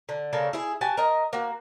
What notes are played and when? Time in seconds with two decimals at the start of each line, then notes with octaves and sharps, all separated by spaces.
0.09 D3
0.33 C#3 A#3 A4 D5
0.53 E4 G#4
0.81 F#4 G4 G#5 A5
0.97 A#4 D#5
1.33 A#3 F#4